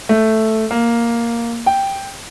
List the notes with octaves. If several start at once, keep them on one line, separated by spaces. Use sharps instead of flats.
A3
A#3
G5